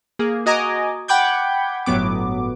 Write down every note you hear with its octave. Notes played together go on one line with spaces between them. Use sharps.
A#3 G#4
F#4 D#5 G#5 A#5 D6
F#5 G5 B5 D6 G6 G#6
G1 A2 F#3 B3 D6